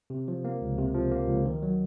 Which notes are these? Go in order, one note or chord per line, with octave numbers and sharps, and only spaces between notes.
C3
F3
A#3
C#2
C3
F3
A#3
C#2
D#3
F#3